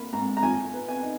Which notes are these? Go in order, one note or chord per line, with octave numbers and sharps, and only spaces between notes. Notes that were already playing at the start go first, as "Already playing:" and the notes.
Already playing: A#3 B5
G#2 A#5
A#5
F3 G#5
B3
G#5
D#4